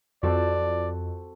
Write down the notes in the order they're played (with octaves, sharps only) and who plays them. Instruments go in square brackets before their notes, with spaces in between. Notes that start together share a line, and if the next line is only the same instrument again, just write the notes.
[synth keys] F2 [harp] C4 F#4 A4 [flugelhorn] D5